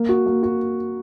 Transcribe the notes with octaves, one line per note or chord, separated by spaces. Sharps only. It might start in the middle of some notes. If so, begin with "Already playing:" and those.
Already playing: A#3
F#4
A#3
F#4